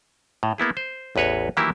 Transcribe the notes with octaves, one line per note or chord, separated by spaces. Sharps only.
A2
A#3 B3 E4 G#4
C5
A1 E2 B4 C#5 D#5
D#3 E3 F#3 A#3 E4 G4